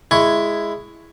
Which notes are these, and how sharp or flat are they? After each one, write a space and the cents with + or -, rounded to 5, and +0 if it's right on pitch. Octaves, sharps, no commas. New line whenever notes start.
G#3 +0 E4 +10 C#6 +0